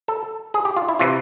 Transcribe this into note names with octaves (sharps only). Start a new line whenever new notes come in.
A4
G#4
G4
F4
E4
C3 E3 F4